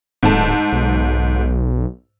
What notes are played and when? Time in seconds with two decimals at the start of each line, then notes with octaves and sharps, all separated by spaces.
0.23 D1 G#2 A3 A5
0.72 B1